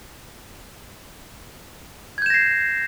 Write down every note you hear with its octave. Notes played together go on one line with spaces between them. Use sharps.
G6 G#6 A#6 C7 E7